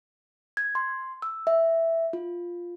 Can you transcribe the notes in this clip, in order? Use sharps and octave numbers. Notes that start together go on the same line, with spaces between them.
G#6
C6
E6
E5
F4